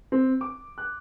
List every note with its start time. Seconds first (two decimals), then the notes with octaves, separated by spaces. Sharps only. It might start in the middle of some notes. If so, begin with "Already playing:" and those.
0.12 C4
0.41 D6
0.78 F#6